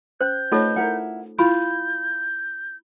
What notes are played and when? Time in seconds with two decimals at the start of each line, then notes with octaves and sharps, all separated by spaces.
0.21 C#4 C5 G6
0.52 A3 D#4 F4 A4 B4 C#5 D#5
0.76 E4 A#4 F#5
1.39 E4 F4 B5 G6